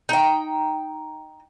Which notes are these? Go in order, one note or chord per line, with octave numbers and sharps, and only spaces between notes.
D#4 G5